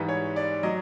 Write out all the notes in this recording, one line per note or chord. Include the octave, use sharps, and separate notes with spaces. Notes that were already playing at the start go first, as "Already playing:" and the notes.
Already playing: G#2 E3 G3 B4
C#5
D5
F#3 D#5